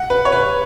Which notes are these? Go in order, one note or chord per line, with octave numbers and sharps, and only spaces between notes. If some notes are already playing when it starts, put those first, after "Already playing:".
Already playing: F#5
B4
C#5
B4